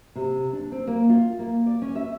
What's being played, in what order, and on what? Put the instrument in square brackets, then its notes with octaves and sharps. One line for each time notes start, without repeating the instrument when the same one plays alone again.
[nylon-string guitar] C3
D4
C4
A#3
F4
A#3
D5
C#4
E5